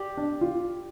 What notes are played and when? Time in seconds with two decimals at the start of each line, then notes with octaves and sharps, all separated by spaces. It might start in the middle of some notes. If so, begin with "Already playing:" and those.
Already playing: G4 D5
0.17 D4
0.41 F4